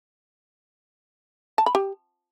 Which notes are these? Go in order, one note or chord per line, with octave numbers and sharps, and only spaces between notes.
A5
B5
G4